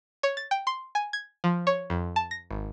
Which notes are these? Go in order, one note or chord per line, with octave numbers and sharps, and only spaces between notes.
C#5
A6
G5
C6
G#5
G#6
F3
C#5
F2
A5
A#6
G#1